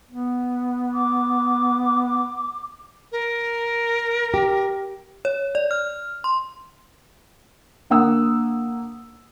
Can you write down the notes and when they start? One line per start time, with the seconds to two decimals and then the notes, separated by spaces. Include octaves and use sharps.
0.10 B3
0.93 D6
3.12 A#4
4.34 G4
5.25 C#5
5.55 D5
5.71 F6
6.24 C6
7.90 D3 A#3 F#5 D#6 E6